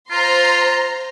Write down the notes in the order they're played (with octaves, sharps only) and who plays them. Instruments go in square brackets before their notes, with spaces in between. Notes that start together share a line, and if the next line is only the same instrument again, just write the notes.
[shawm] F4 [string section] C5 A#5 C6